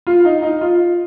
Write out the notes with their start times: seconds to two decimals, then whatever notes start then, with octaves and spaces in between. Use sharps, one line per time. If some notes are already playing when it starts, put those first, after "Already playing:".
0.07 F4
0.25 D#4
0.42 D#4
0.61 F4